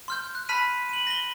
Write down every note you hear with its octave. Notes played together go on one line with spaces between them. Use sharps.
C6 F6 G6
F#6
A5 B5 F6 B6 D#7
D#7 F#7
A#6 G7